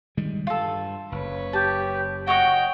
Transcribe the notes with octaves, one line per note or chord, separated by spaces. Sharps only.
D#3 G3 G#3
G2 F4 A4
F#1 B4 C#5
G4 A5
F#4 C#5 D#5 F#5 G5